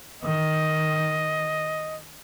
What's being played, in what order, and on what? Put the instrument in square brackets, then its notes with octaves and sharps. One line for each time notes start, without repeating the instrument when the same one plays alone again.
[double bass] D#3 [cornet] D#5